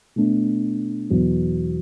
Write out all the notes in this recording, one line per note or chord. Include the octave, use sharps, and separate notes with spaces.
B2 A3 D4
E2 B2 F#3